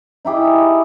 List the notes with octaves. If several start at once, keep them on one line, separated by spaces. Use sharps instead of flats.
D#4 E4 G4 G#4